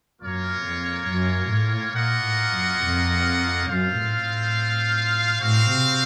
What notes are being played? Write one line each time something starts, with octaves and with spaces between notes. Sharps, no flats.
F#2 A#3 F4 A#4 C#5
F2
F#2
A2
A#2 A#3 F4 A#4 D#5 F#5
A2
F#2
F2
F#2 C4 F4 C5 F5
A2
A2
A2 C4 F#4 C5 F5
C3